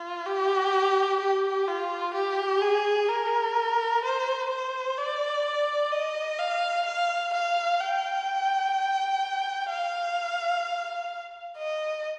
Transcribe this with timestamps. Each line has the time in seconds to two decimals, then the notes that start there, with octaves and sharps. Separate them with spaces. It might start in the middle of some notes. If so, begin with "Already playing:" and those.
Already playing: F4
0.26 G4
1.20 G4
1.67 F4
2.14 G4
2.62 G#4
3.09 A#4
4.04 C5
4.50 C5
4.98 D5
5.91 D#5
6.39 F5
6.85 F5
7.33 F5
7.80 G5
9.69 F5
11.57 D#5